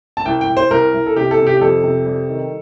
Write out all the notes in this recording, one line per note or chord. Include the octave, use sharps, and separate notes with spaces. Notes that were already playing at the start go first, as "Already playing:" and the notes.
A5
C2 G5
G5
C2
C5
C2 A#4
C2
A4
C3 G4
A4
C3
G4
G4
F2 A4
C3
G3
D#3